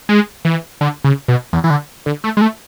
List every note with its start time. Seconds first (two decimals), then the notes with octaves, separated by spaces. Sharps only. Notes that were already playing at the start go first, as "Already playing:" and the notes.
0.09 G#3
0.45 E3
0.81 D3
1.04 C#3
1.28 B2
1.53 E2
1.64 E3
1.70 D3
2.06 D3
2.24 A3
2.37 G#3
2.42 A3